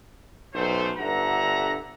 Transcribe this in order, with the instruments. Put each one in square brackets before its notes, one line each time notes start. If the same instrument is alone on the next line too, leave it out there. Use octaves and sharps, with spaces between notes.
[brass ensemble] B1 F#2 A3 C5
G1 G2 D3 E5 F#5 A#5